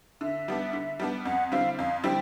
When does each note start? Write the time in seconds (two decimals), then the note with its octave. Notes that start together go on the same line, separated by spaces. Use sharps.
0.21 D3 E5
0.48 G3 B3 D4
0.73 D3
1.00 G3 B3 D4
1.25 F2 F#5
1.52 D3 G3 C4 E4 F5
1.79 F2 F5
2.04 D3 G3 C4 E4 G5